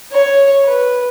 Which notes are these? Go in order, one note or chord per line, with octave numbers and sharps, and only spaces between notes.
C#5
B4